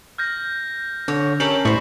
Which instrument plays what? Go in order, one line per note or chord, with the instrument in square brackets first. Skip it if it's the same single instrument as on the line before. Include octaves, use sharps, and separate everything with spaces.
[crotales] F6 G6 A#6
[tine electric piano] D3 [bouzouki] C#5
[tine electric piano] C#4 A#4 [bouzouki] G4 A4 C#5 [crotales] F#7
[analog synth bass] A2 [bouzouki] G3 C5 [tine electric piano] B5 C#6